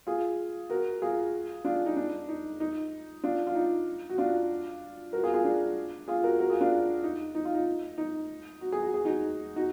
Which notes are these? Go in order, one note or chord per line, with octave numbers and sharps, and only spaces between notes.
F4 G#4
F#4 A#4
F4 G#4
D4 F4
D#4
D4
D#4
D#4
D4 F4
F4
D#4
F#4
D4 F4
F#4 A#4
F4 G#4
F4 G#4
D4
F4 G#4
F#4 A#4
F#4 A#4
F4 G#4
D4 F4
D#4
D#4
F4
D#4
D#4
F#4
G#4
F#4
G#4
D#4 F#4
D#4 F#4